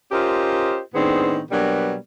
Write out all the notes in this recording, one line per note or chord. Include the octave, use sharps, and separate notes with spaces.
C#4 F4 G4 A#4 C5 D#5
A2 D#3 B3 C4 D4 G#4
B2 F#3 G3 A#3 B3 D4